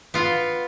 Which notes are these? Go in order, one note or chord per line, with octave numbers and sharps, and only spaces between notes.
B3 F4